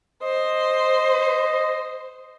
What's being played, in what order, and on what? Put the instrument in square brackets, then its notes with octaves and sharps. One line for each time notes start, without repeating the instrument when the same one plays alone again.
[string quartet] C5 [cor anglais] D#5